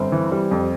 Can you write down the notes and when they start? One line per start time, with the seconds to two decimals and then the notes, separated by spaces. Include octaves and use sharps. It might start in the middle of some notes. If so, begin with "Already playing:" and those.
Already playing: G1 C4
0.12 E3
0.32 G3
0.51 F2